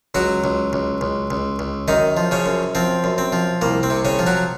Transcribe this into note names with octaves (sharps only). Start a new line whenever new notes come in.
C#2 F#3 F#4
C#2
C#2
C#2
C#2
C#2
F#2 D#3 D#4
F3
C#3 C#4
F#2
F3 C4
F#2
C4
F3
C2 A#3
C4
C3
C#3 C#4
F3
F#3 F#4